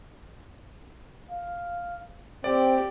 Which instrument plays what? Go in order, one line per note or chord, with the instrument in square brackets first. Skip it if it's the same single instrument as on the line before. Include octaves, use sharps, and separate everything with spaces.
[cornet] F5
[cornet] C4 [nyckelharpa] G4 [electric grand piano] D5